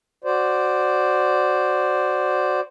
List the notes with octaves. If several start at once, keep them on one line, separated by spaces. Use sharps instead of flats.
F#4 C5 D5